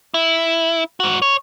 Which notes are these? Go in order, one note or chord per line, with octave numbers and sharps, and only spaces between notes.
E4
G#2 F#4
C#5